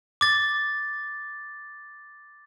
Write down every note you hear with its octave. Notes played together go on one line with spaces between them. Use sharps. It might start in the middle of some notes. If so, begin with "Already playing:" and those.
D6 A6